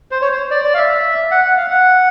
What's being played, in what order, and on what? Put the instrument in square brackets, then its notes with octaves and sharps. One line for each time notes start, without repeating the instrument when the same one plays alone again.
[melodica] C5
C#5
C5
D5
D5
F5
E5
F#5
F#5
F5
F#5